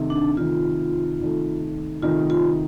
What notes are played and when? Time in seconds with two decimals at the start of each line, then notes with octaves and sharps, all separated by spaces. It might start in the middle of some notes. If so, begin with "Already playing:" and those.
Already playing: C3 D#3 A3 D#4
0.10 D4
0.37 C3 D#3 A3 D#4 F4
1.20 C3 D#3 A3 D#4
2.02 C3 D#3 A3 D#4 F4
2.30 F4